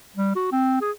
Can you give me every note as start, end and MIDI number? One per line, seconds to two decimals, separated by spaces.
0.16 0.31 55
0.35 0.48 66
0.52 0.76 60
0.81 0.91 68